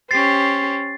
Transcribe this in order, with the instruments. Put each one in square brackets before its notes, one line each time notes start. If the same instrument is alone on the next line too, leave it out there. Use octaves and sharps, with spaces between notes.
[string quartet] C#4 G4 C5 [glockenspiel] A6 C7